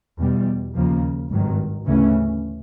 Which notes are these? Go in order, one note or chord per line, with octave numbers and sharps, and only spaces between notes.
E2 B2 G3
D#2 C#3 F3 A#3
G#1 G2 D#3 F#3
D2 C#3 E3 A3 C#4